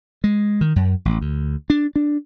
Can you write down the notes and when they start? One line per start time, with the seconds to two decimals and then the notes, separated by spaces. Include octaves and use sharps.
0.24 G#3
0.61 D#3
0.76 F#2
1.05 A1
1.21 D2
1.70 D4
1.96 D4